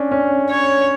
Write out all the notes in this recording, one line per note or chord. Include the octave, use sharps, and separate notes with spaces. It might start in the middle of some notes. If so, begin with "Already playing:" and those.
Already playing: C#4 D4
C#4
C#5